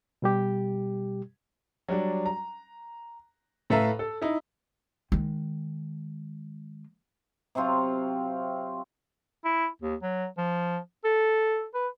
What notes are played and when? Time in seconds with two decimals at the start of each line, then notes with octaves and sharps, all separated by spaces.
0.22 B2 G3 G4
1.88 F#3 G3 D4
2.26 A#5
3.70 A2 A4 B4 E5 F5 A#5
3.99 A4
4.21 D#4 E4
5.12 D#3 G#3
7.55 C3 F#3 C4 F4
9.44 E4
9.82 D#2
10.02 F#3
10.37 F3
11.04 A4
11.74 B4